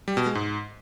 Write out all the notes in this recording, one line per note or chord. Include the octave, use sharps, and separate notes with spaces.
G3
B2
G#3
G#2